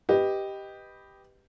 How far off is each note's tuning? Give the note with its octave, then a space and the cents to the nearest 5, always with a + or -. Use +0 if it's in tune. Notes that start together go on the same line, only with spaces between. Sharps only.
G4 +0 B4 +0 D#5 +0